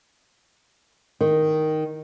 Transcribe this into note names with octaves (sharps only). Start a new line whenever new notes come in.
D#3